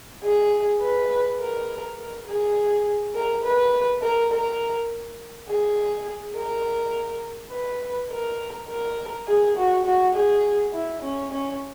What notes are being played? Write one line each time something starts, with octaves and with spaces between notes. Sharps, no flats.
G#4
B4
A#4
A#4
G#4
A#4
B4
A#4
A#4
G#4
A#4
B4
A#4
A#4
G#4
F#4
F#4
G#4
E4
C#4
C#4